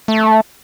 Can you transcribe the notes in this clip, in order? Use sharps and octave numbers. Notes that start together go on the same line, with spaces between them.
A3